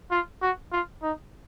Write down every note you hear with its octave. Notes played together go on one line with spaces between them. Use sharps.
F4
F#4
F4
D#4